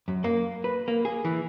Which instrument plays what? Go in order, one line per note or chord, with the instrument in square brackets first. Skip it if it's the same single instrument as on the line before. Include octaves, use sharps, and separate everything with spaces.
[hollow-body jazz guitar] F#2
A#3
B4
A#3
G#4
E3